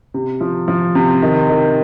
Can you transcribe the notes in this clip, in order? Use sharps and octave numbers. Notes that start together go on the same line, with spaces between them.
C3
F3
F3
C3
D#3
D#3